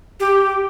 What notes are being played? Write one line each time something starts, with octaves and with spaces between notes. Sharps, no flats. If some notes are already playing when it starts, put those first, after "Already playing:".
G4